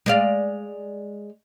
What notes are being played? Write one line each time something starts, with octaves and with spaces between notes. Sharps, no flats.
G#3 D5 F5